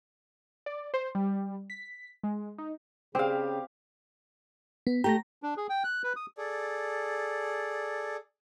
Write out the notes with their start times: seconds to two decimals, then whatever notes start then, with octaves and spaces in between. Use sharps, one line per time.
0.66 D5
0.94 C5
1.15 G3
1.70 B6
2.23 G#3
2.58 D#4
3.15 C#3 C4 G4 F5
4.87 B3
5.04 A3 G4 A#5 A#6
5.43 D4
5.57 G#4
5.69 G5
5.84 F#6
6.03 B4
6.16 D#6
6.36 G#4 A4 D5